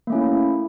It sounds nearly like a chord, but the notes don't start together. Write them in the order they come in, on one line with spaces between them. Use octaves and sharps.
A#3 A3 C#4 E4